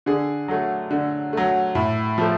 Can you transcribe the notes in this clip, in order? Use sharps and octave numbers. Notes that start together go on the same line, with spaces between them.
D3 G#4
F#3 A3
D3
F#3 A3
A2
F3 A3